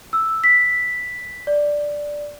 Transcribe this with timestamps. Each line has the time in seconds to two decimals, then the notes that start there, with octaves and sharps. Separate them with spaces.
0.13 E6
0.44 B6
1.47 D5